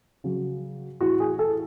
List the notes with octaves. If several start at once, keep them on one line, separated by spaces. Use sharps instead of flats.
C#3 F#3
A2 E3 F#4
G#4
A4